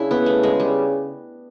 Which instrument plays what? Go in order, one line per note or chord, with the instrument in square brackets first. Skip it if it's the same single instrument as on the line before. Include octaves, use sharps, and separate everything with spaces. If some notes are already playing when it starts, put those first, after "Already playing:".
Already playing: [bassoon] C#3 [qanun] D4 E4
[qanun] B3
A3
G#3
G3